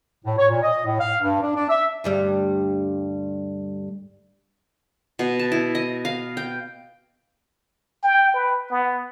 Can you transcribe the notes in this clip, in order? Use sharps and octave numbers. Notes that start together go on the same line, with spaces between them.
A2
C#5
A#2
D#5
A2
F5
G2
D4
D4
E5
D2 G2 G3
B2
A5
E4
D#5
F5
G5
G5
B4
B3